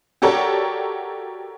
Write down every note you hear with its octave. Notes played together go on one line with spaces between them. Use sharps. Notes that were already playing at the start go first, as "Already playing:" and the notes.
F#4 G4 A4 A#4 C#5 D5